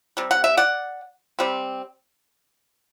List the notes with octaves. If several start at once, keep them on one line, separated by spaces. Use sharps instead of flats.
C3 G3
F#5
E5
D5 F#5
C3 G3 C4